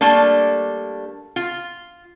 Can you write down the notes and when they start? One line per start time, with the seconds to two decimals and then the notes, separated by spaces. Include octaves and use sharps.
0.01 G3 A3 A#3 D4
1.36 F4